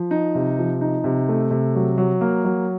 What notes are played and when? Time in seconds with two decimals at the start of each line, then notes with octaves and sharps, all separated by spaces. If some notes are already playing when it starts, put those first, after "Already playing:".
Already playing: F3
0.11 D#4
0.35 C3
0.59 F3
0.81 D#4
1.04 C3
1.29 A3
1.51 C3
1.75 F#3
1.98 F#3
2.21 A#3
2.44 F#3